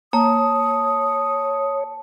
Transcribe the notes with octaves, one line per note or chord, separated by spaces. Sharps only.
A#3 C#5 A5 D#6